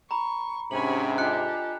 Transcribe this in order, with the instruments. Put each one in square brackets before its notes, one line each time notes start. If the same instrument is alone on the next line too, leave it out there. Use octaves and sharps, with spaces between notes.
[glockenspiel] A#5 B5 [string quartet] C#6
[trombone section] G#2 C3 [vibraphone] C#4 D4 [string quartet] C#5 G#5 B5 [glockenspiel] F#7
[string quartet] D4 G4 A4 [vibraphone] F4 D#5 G#5 [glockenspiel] F#6 C#7